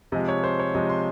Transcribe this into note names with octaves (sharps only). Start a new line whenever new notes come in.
C3 F3 G#3 D#5
C#5
C5
C#5
C3 F3 G#3 D#5
C6